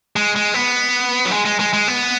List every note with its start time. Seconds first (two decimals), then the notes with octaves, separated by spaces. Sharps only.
0.16 G#3
0.36 G#3
0.54 B3
1.25 F#3
1.31 G#3
1.46 G#3
1.60 G#3
1.73 G#3
1.88 B3